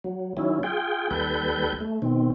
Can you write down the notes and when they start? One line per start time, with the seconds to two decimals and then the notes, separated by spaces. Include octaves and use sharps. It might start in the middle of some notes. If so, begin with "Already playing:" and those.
0.04 F#3
0.37 D#3 F#3 C#4 E4
0.63 F4 G#4 G5
1.11 D#2 G3 A4 B4 G6
1.81 A3
2.02 B2 D#3 C4